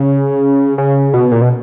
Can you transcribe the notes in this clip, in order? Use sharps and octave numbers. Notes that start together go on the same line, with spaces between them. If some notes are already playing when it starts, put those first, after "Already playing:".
Already playing: C#3
C#3
B2
A#2
B2